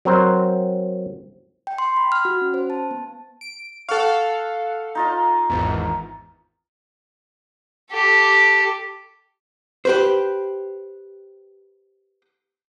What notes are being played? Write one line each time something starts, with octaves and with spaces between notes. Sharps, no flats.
F#3 C4 A#4 C5
G5
C6
B5
F6
F#4
C#4
C5
A5
B3
D7
A4 F5 F#5 C#6
D#4 F4 D#5
G#1 E2
G4 A4
G4 B4 C5